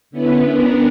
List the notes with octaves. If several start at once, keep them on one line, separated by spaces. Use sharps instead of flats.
D3 B3 C#4 E4 B4
B3 D4 A#4